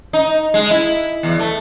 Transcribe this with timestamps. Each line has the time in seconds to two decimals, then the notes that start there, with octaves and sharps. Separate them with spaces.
0.13 D#4
0.54 G#3
0.71 E4
1.23 E2
1.39 A3